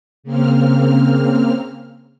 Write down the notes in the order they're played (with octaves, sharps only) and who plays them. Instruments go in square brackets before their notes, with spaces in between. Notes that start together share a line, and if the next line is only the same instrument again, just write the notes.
[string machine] C#3 A#3 C4 F6